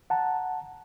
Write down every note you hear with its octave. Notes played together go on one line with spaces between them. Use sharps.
F#5 A5 A#5